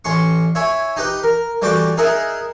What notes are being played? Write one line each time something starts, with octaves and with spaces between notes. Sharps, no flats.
A1 C#4 C6 C#6
E4 C#5 E5 G#5
D#4 G4 B4
A#4
E3 G3 A3 F#4 G5 D6
D#4 G#4 A#4 E5 F#5